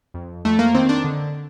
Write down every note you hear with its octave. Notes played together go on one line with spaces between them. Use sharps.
F2
F2 A3
A#3
D#3 C4
D4
D3